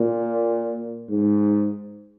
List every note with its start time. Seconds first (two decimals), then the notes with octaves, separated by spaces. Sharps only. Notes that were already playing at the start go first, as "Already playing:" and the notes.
Already playing: A#2
1.10 G#2